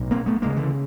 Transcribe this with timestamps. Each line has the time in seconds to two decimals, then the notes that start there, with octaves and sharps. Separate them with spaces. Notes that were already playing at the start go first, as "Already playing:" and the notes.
Already playing: B1 A2
0.11 A#3 C4
0.26 A3 B3
0.41 D2 C#3 G#3 A#3
0.56 D3 E3